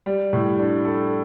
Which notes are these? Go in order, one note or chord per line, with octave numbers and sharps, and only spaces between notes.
G3
A2
D4
A4